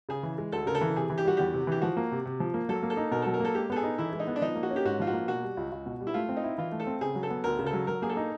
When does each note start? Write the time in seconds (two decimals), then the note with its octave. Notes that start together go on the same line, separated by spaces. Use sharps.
0.09 C#3 G#4
0.23 E3
0.38 G#3
0.52 D2 A4
0.66 C#3 A#4
0.75 A4
0.81 E3
0.96 C3 G#4
1.10 E3
1.18 G4
1.25 G3 F#4
1.37 E2 G4
1.54 C3
1.67 E3 G4
1.82 F3 F#4
1.97 A#3
2.12 C3
2.26 C3
2.40 F3
2.54 A#3
2.69 F#3 A4
2.83 A#3
2.90 A4
2.97 D#4
3.11 B2 A#4
3.22 F#3 A4
3.34 A#4
3.40 A#3 A4
3.55 G#3 G4
3.70 B3 A4
3.76 G#4
3.84 D#4
3.98 E3 E4
4.13 G#3
4.19 D#4
4.27 B3
4.36 D4
4.42 F3 D#4
4.55 A#3
4.63 F#4
4.71 C#4
4.76 G4
4.85 G#2 F#4
5.00 F3 F4
5.07 F#4
5.13 A#3
5.28 B2 F#4
5.43 G3
5.57 C#2
5.72 C#2
5.86 B2
6.00 G3
6.07 E4
6.14 A3 F4
6.29 C4
6.37 D#4
6.43 E4
6.58 E3 F4
6.72 A3
6.80 A4
6.87 C4
7.01 C#3 G#4
7.15 F#3
7.23 A4
7.30 B3
7.44 D2 A#4
7.59 C#3
7.66 A4
7.73 F#3
7.87 F#3 A#4
8.02 A#3 G#4
8.09 A4
8.17 D#4